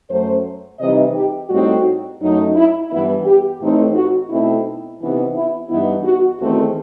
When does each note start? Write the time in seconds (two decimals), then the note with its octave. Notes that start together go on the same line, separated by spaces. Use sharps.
0.09 F#2 F#3 A3 C5
0.79 C3 E3 G3 D#4 D#5
1.14 G4
1.49 A2 G3 C4 D#4 F#4
2.20 F#2 F#3 A3 D#4
2.55 E4
2.90 G2 E3 B3 E4
3.25 G4
3.60 A2 E3 A3 C4 D#4
3.94 F#4
4.29 B2 A3 C4 D#4 E4
5.00 C3 E3 B3 D#4
5.35 E4
5.69 G2 E3 B3 D#4 E4
6.04 F#4
6.40 E2 D#3 A3 C4 F#4